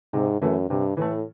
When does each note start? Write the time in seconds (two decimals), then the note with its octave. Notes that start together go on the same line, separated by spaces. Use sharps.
0.13 G#2 C3
0.41 F#2 E3 A3
0.69 G2 C3
0.97 A2 E3 A3